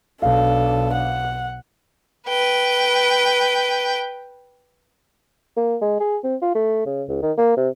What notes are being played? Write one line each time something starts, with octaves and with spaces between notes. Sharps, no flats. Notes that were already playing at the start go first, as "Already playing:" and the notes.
B1 D4 A4 F5
F#5
B4 G5
A#3
G#3
G#4
C4
F4
A3
C#3
C#2
D#3
A#3
C3